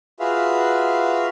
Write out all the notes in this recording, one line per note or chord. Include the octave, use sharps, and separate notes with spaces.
F4 F#4 G#4 B4 E5 F5